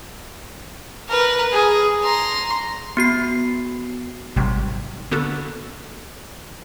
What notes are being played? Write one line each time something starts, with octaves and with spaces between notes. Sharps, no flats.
A#4 B4
G#4
A#5 C6
B3 F#4 C7
G#1 C3 F#3 G3
D3 A#3 B3 F#4 A4